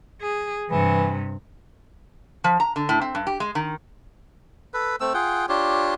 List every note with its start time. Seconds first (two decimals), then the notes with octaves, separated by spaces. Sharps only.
0.21 G#4
0.70 G2 C3 E3
2.44 F3
2.60 A#5
2.76 D3
2.89 A2
3.01 C4
3.15 G2
3.27 G4
3.40 G#3
3.55 D#3
4.74 A4 B4
5.01 A3 C4 E6
5.14 F4 G#4 F#5 G5
5.49 D4 F4 G4 C#5